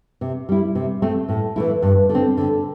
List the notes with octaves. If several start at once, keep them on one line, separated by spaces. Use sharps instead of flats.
C3
G3 E4
C3
A3 C4
A2
E3 A3 E4
G2
D3
C4
D3